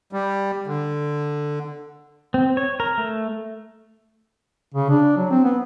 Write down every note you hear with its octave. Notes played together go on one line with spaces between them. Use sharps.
G3
D3
C4
C#5
A#4
A3
C#3
D4
F#3
C4
B3